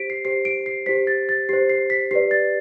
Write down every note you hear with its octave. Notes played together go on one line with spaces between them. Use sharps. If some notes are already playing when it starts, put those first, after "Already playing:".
Already playing: G4 C5 B6 D7
C7
G4 C5 C7
D7
C7
G4 C5 B6
A6
A6
G4 C5 C7
C7
B6
G4 B4 D5 C7
A6